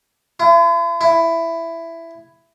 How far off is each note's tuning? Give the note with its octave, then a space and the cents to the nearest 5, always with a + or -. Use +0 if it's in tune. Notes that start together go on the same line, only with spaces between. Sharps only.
E4 +45
E4 +10